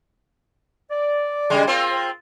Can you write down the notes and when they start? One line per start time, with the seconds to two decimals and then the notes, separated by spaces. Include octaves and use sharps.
0.91 D5
1.50 C#3 G3 G#3
1.67 A#3 C4 F4